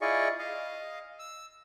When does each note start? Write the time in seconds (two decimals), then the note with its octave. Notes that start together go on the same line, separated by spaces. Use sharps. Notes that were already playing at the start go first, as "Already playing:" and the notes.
0.01 E4 F4 G#4 D5 D#5 C#6
0.39 D#5 F5
1.19 E6